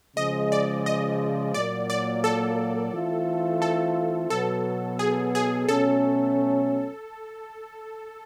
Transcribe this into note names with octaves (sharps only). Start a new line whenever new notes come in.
C#3 F3 G#3 D#5
D5
D#5
A#2 F#3 A#3 D5
D5
A4
E3 A3 C4 F4
A4
B2 F#3 B3 A4
G#4
G#4
B2 F#3 A3 C#4 A4